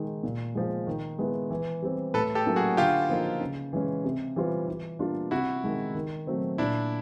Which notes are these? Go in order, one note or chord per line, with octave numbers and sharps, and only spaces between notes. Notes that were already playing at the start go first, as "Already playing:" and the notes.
Already playing: D#3 G#3
A#2
F3 G#3
D#3
G#3 B3 E4
E3
G3 C4
A2 A4 B4
G4 A4
F#3 A#3 C#4 E4
F#4 G#4
D3 F4 G4
F3 A#3 D#4
C#3
E3 G#3 C#4
C3
E3 G3 C4 F4
E3
G3 A#3 D4 F4
C3 E4 F#4
D#3 G#3
D#3
F#3 A3 C4
A#2 D4 E4